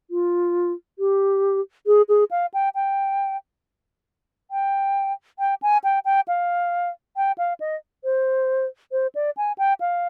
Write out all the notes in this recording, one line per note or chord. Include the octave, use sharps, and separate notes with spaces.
F4
G4
G#4
G#4
F5
G5
G5
G5
G5
G#5
G5
G5
F5
G5
F5
D#5
C5
C5
D5
G#5
G5
F5